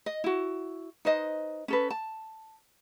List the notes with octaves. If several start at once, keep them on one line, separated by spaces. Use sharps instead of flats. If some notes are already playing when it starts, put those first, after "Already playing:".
D#5
E4 F#4
D#4 B4 C5 D#5
C#4 A4 B4
A5